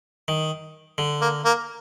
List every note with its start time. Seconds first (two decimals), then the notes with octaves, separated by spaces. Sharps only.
0.28 D#3
0.98 D3
1.21 A#3
1.45 A#3